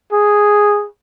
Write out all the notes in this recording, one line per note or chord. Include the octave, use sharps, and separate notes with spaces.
G#4